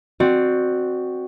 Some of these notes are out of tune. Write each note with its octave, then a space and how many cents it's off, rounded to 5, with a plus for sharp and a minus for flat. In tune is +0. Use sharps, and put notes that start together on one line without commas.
C4 +0 F#4 +0 D5 +30